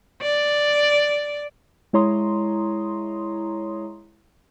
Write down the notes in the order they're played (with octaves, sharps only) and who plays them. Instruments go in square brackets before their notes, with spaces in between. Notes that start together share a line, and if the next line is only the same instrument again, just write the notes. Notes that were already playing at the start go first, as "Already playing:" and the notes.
[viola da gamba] D5
[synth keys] G#3 E4 C#5 A#5 C6 D#6